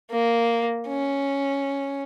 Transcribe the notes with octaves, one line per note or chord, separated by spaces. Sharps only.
A#3
C#4